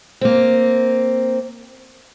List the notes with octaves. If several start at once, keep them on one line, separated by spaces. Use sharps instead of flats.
A#3 C4